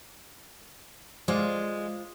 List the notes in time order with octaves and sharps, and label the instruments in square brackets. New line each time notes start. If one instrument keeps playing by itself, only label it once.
[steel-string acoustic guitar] G#3 [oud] F4 C5 D5